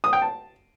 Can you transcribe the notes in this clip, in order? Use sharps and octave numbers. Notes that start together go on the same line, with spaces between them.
D#6
G5
A5